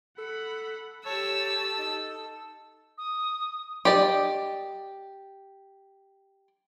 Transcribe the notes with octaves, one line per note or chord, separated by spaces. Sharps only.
A4 F#5 B5
G4 A4 C#5 A5 E6
D#4
D#6
G4 D5 D#5